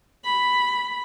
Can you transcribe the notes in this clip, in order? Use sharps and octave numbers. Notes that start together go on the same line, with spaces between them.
B5